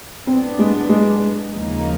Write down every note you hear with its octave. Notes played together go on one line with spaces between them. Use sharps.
A2 F#3 B3 C4 D4
G#3
G#3
D#2 C#3 F3 A#3 D#4